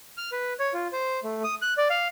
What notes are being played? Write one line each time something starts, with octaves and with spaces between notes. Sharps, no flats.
F6
B4
C#5
F4
C5
A3
D#6
F#6
D5
F5